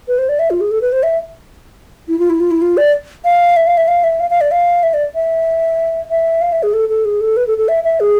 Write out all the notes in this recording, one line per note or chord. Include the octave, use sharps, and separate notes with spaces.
B4
C5
D5
E5
F4
G#4
A4
B4
C5
E5
E4
F4
E4
F4
E4
F4
D5
F5
E5
F5
E5
F5
E5
F5
F5
D5
F5
E5
D5
E5
E5
F5
E5
G#4
A4
A4
G#4
A4
B4
A4
A4
E5
E5
G#4